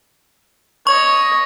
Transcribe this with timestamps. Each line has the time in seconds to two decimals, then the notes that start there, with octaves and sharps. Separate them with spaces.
0.87 C#5 D#5 C#6